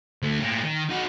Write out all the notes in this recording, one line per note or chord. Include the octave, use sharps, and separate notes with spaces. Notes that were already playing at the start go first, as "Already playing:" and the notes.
D2 A3
A2 A#3
D#3
D#4 F#4